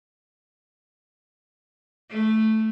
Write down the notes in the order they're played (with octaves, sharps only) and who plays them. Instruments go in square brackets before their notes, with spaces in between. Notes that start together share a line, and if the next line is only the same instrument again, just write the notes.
[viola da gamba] A3